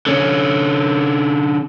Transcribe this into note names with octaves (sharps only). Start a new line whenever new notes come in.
D3 C#4